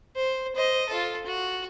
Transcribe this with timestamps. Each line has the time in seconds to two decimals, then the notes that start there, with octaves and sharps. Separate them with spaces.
0.16 C5
0.55 C5 D#5
0.89 F4 A4
1.27 F#4